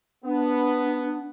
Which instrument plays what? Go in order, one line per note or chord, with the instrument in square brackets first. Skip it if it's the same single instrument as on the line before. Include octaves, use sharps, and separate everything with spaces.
[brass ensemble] B3 [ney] D4